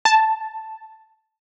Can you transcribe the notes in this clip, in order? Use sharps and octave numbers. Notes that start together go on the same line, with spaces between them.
A5